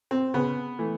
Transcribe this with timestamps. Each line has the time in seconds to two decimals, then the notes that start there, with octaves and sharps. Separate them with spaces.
0.11 C4
0.34 C#3 B3
0.79 E3 A3